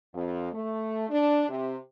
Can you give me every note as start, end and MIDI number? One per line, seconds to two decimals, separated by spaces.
0.14 0.52 41
0.52 1.05 57
1.09 1.43 62
1.49 1.75 48